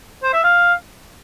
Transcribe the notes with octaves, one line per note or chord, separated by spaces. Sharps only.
C5
E5
F5